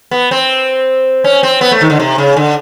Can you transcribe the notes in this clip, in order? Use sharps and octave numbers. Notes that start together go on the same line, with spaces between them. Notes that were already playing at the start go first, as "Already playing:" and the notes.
B3
C4
C#4
C4
B3
A3
D#3
D3
C3
C#3
D3